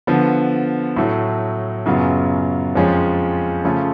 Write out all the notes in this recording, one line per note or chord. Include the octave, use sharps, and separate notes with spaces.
D3 F3 B3
A2 F#3 A3
F#2 C#3 F#3 B3 F4
F2 F3 G#3 C#4 F4
C#3 F3 A3 C#4 F4